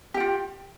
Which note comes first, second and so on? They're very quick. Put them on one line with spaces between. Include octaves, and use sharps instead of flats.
G4 G5 F4